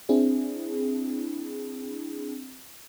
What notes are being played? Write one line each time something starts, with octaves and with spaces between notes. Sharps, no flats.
C4 D4 E4 G#4